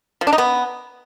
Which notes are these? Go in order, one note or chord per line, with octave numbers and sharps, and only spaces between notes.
F3
D4
D#4
B3